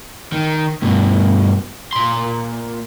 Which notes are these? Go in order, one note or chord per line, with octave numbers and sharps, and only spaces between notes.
D#3
G2 B2
A#2 C6